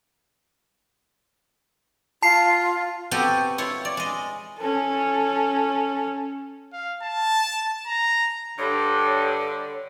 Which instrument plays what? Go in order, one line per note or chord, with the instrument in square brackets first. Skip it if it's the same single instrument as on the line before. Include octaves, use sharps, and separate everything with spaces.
[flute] F4 [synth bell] A5 C7
[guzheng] B3 C4 F#4 G4 A4 G5
E4 F4 C#5
D5
G#3 D#5
[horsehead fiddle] C#4 A4
[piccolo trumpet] F5
A5
A#5
[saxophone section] G2 [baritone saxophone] D3 [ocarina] C#5